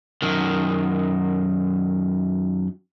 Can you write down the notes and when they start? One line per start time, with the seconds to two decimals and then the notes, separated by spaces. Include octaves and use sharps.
0.22 F#2 D#3